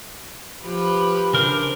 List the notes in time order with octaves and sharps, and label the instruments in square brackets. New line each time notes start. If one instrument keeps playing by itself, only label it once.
[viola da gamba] F3 G4 B4
[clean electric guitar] C#3 A#4 C5 [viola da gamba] D4